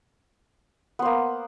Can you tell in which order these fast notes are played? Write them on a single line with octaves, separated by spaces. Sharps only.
B3 C5 A#3